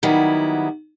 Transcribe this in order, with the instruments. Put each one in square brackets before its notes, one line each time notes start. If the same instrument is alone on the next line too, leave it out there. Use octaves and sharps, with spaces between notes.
[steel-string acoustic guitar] D#3 F#3 G3 B3 E4